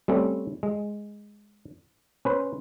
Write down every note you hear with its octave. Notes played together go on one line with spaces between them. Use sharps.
G3 A3 C4 C#4
G#3
C#4 B4 C5